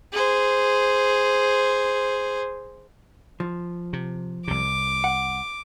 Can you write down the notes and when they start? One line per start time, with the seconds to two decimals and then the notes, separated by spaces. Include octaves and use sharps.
0.12 G#4 C5
3.40 F3
3.93 C3
4.48 C2 C3 D6
5.04 F#5